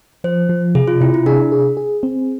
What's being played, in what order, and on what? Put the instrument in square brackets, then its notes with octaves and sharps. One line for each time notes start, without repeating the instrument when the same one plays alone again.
[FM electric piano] F3 [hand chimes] C5
[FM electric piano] F3
[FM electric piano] C3 [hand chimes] G#4
[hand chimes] F4
[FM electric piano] C3 [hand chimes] E4
[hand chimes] E4
[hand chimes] D4 [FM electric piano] G#4
[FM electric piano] G#4
G#4
C4